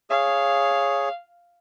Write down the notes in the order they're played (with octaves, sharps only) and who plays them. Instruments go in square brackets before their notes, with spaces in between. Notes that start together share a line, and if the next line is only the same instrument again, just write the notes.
[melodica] G#4 C#5 [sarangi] F5